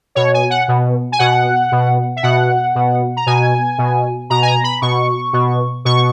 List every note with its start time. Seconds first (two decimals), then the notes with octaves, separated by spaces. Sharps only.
0.15 B2 C#5
0.34 G#5
0.50 F#5
0.68 B2
1.12 G#5
1.19 B2 F#5
1.72 B2
2.16 E5
2.23 B2 F#5
2.75 B2
3.17 A#5
3.26 B2 G#5
3.78 B2
4.30 B2 A#5
4.42 G#5
4.48 A#5
4.64 B5
4.82 B2 C#6
5.33 B2
5.85 B2 C#6